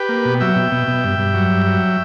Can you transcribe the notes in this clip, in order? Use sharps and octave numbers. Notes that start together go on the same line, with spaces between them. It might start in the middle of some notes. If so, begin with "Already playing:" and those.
Already playing: G4 B4
A#3
B2
F#3 E5 G5
B2
B2
B2
G2
G2
F#3
G2
F#3